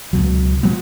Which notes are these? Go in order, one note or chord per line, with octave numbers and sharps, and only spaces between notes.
C#2 B2 F#3
F3 G#3 B3